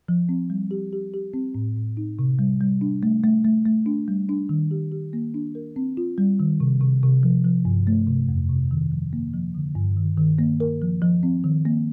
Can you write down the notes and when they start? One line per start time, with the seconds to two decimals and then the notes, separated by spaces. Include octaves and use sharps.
0.08 F3
0.29 C4
0.50 G3
0.71 G4
0.93 G4
1.14 G4
1.34 C4
1.55 A2
1.76 A2
1.97 D#4
2.19 C3
2.39 G3
2.61 G3
2.81 D4
3.03 A3
3.24 A3
3.45 A3
3.66 A3
3.86 D4
4.08 G3
4.29 D4
4.49 D#3
4.71 G4
4.92 G4
5.13 A#3
5.34 D4
5.55 A#4
5.76 C4
5.97 F4
6.18 G3
6.40 D#3
6.60 C3
6.81 C3
7.03 C3
7.23 F3
7.45 F3
7.65 G2
7.87 A3
8.07 C3
8.28 F2
8.49 C3
8.71 D#3
8.92 F3
9.13 A#3
9.34 F3
9.55 D3
9.75 G2
9.97 D#3
10.18 D#3
10.39 A#3
10.60 A#4
10.82 F3
11.02 F3
11.23 C4
11.44 D#3
11.65 A#3